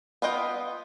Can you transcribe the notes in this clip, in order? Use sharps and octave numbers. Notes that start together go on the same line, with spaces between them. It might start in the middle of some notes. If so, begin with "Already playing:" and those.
B3 F4 D#5 G5